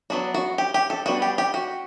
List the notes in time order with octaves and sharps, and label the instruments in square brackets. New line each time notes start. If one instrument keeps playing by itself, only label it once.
[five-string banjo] F#3 B3 D4 F#4
F#4
G4
G4
A4
G3 B3 D4 F#4
G4
G4
F#4